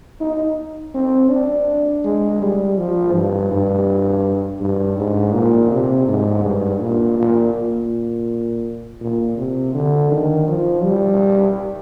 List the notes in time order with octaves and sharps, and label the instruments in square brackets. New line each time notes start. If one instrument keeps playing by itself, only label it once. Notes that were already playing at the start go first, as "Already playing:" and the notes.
[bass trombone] D#4
C4
D4
G#3
G3
F3
G2
G2
G2
G#2
A#2
C3
G#2
G2
A#2
A#2
A#2
A#2
C3
D3
D#3
F3
G3